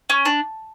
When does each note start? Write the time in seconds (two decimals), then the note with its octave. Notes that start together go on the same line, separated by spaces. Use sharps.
0.10 C#4
0.25 D4